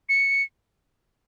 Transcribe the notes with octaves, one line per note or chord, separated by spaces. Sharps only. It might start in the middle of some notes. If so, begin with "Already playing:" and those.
C#7